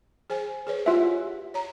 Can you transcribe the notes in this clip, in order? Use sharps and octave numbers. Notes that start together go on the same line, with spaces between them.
G#4 C5 G#5
G#4 B4 C#5
F4 G4 E5 F#5 G#5
C#5 A#5